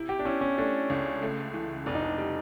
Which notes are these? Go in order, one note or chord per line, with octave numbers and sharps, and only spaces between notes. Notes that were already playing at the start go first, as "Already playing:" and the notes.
Already playing: C3 E4
G4
D4
C#4 E4
C#4
A3 D4
C#2
A3
E3
F1 D4
D#4
D4
G3